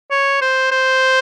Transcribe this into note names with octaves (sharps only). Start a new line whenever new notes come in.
C#5
C5
C5